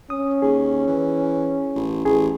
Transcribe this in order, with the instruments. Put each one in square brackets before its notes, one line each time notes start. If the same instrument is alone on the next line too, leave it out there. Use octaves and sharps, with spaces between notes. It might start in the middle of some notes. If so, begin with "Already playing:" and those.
[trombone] C#4 [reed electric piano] D#6
[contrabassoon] D#2 [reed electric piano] G#4
[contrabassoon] E3
A1
[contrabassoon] A1 [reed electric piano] G#4